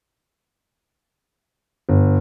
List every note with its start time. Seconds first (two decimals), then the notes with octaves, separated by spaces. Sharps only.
1.89 G1